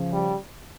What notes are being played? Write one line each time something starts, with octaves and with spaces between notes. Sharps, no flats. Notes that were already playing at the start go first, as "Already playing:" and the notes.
Already playing: C#3 F3
G3